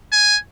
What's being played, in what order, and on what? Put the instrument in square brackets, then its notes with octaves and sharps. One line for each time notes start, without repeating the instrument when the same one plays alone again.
[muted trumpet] G#5